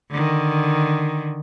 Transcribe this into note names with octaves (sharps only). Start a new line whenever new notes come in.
D3 D#3